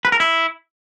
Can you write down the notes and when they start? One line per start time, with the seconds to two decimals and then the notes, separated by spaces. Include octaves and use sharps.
0.05 B4
0.12 A#4
0.20 E4